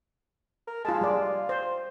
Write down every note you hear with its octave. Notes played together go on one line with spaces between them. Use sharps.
A#4
G#3 F4 A5
G3 D5
F4
C5